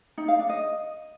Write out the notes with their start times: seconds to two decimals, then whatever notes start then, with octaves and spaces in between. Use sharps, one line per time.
0.18 D#4
0.28 F5
0.39 D4
0.49 D#5